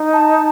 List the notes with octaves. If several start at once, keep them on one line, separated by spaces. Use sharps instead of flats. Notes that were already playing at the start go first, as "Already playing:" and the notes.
Already playing: D#4
A5